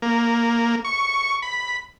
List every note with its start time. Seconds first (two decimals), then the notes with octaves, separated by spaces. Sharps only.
0.02 A#3
0.85 C#6
1.42 B5